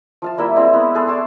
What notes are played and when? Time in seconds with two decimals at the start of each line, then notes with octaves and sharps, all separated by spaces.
0.22 F3 F5 A5
0.38 G3 A#3 E4 E5
0.56 G#3 C4 E4
0.74 B3
0.94 B3 G#4 A4 C6
1.07 D5 A5 C6 C#6